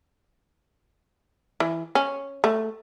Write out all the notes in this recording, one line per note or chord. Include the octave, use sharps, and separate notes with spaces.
E3
C#4
A3